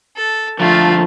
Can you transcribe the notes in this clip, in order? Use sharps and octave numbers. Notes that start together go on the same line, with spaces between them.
A4
D3 F3 A3 F4